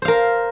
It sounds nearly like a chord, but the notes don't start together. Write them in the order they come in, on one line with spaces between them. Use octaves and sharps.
C5 F5 A#4